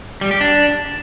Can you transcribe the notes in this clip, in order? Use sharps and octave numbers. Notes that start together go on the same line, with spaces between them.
G3
G4
D4